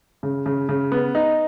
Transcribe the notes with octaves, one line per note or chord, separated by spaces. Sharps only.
C#3
C#3
C#3
B3
D#4